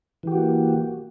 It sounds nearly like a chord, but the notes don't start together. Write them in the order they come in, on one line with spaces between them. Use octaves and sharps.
E3 G4 F#4 A#3